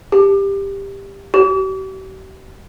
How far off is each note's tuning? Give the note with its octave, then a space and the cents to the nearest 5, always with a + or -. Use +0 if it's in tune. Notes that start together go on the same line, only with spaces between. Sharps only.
G4 +10
G4 -45